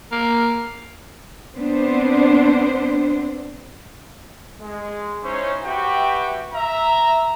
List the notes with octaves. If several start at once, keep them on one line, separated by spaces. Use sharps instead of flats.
A#3
B3 C4 D4 C5
G#3
C#4 D#4 E4 C5 C#5
F#4 G4 B4 E5 G5
E5 A#5